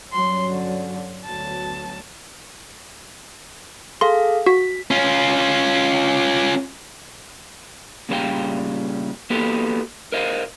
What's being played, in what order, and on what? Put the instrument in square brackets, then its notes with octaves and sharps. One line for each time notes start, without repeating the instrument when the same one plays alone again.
[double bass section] G2 F#3 C#4 [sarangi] C6
[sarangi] D3
[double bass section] D2 F#3 B3 [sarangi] A5
[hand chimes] G#4 A4 F5 [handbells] C6
[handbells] F#4 [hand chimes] B6
[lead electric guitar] C#4 F4
[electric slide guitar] A#2 C#3 G3 C5 F5 G5
A#3 B3 F#4 G4 A4
A#4 C5 D#5 F5